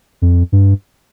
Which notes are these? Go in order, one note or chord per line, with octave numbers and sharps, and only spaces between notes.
F2
G2